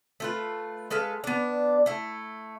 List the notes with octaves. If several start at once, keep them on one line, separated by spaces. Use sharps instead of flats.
A3 F4 B4
G#3 A4 B4 F5
B3 D4
A3 E4